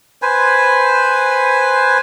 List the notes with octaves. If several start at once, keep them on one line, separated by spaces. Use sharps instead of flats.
B4 C5 G#5